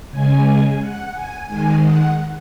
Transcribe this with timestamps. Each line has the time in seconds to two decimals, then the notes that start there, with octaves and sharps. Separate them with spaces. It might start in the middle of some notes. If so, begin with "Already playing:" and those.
0.11 C#3 G#3 G#5
0.80 F#5
1.13 G#5
1.47 D#3 G#3 G#5
1.81 F#5